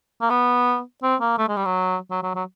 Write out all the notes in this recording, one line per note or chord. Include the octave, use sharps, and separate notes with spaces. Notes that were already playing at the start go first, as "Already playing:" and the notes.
A#3
B3
C4
A#3
A3
G#3
G3
F#3
F#3
F#3
F#3